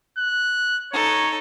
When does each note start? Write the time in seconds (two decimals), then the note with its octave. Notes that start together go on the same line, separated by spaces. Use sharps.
0.18 F#6
0.93 D#4 A4 C#5